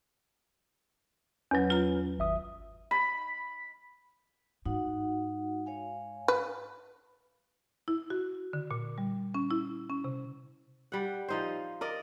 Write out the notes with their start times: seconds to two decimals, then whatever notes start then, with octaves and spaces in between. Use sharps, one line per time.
1.51 E2 F#3 C#4 B4
1.70 F4 A#5
2.19 G#1 E5 D#6
2.91 B5
4.66 G#2 D#4 F#4 F#5
5.66 C#5 F5 G#5
6.28 B4
7.88 E4
8.10 F#4
8.53 D3
8.71 A#2
8.98 G3
9.35 C#4
9.51 E4
9.89 C#4
10.04 C3
10.92 G3 F#5
11.28 F3 D#4 C5
11.81 A#4 D5 D#5